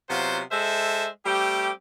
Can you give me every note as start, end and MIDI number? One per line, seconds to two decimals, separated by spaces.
0.10 0.41 48
0.10 0.41 54
0.10 0.41 59
0.10 0.41 65
0.10 0.41 72
0.52 1.08 56
0.52 1.08 69
0.52 1.08 72
0.52 1.08 76
1.26 1.71 55
1.26 1.71 57
1.26 1.71 60
1.26 1.71 67